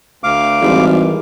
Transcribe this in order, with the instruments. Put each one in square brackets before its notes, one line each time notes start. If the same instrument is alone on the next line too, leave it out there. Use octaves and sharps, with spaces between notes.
[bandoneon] D2 F5 D6
[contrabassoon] G#1 [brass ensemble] E3 G3